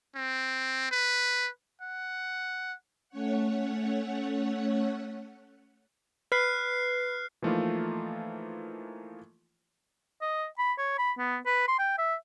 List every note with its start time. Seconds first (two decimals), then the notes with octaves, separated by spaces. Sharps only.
0.15 C4
0.91 B4
1.81 F#5
3.09 A3 C#4 C#5 F#5
6.32 B4 F6 F#6 C7
7.42 E3 F3 A3 A#3 D#4 F4
10.22 D#5
10.58 B5
10.78 C#5
10.98 B5
11.18 B3
11.46 B4
11.68 C6
11.79 G5
11.98 E5